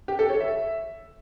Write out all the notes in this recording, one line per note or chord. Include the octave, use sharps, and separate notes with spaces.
G4
A4
C#5
E5